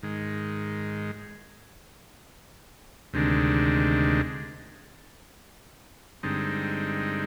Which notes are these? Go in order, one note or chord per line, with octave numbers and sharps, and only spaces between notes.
G#2 D#3 G#3
D2 C3 D#3 G#3 D4
G2 D3 G#3 C4 D#4